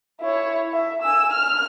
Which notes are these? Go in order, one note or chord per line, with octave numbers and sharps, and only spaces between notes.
E4 C#5
E5
G#5 E6
F6